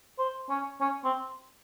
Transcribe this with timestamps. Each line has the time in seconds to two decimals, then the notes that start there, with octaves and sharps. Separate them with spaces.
0.19 C5
0.50 C#4
0.81 C#4
1.04 C4